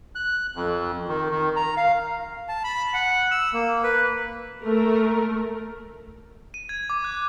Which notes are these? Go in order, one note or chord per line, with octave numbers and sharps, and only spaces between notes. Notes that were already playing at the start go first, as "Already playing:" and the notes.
F#6
F2
D#3
D#3
A#5
F5
A5
B5
F#5
E6
A#3
B4
A3 A#4
D#7
G#6
D6
F#6